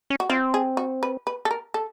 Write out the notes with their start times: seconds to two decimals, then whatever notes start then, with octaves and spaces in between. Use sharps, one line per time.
0.10 C#4
0.20 F#4
0.29 C4 F4
0.54 G#4
0.77 F#4
1.03 B4
1.27 B4
1.45 A4
1.51 A#4
1.74 A4